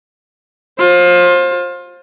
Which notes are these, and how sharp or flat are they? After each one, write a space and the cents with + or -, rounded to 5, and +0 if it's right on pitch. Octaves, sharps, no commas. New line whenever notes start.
F4 +25 C5 +25